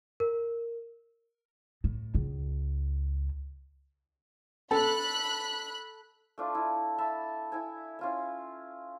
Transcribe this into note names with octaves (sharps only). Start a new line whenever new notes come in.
A#4
A2
C#2
A4 B5 F#6
A3 D4 F4
E4
E5 A5 B5
E4 E5 G#5
C#4 F4 E5